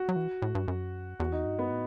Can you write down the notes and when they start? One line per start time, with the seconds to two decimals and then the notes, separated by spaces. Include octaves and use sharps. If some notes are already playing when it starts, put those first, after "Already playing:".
Already playing: F#4
0.09 F#3
0.16 E3
0.42 A2
0.55 G2
0.68 F#2
1.20 E2 F#4
1.32 D#4
1.45 G2
1.59 B3
1.71 A2